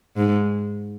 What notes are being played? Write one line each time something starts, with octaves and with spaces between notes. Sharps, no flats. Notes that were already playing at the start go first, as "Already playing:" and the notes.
G#2